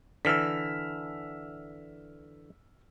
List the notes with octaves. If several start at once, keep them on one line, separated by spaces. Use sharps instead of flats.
D3 E3 E6 F6 B6